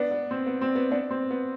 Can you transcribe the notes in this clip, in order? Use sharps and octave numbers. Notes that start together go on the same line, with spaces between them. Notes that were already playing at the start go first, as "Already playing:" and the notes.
Already playing: B3 D4
B3
C4
B3
C4
B3
B3 D4
C4
B3